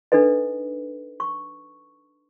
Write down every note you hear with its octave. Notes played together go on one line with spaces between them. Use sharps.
D4 D#4 A4 B4 D#5
C#6